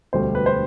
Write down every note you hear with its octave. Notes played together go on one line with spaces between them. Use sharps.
E1 D2 D3 G3 C5
B4
C5